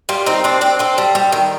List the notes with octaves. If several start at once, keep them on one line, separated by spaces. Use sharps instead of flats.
G3 F4
C4 D#4
C4 D4
C4 D4
C4 A4
G3
G3
D#3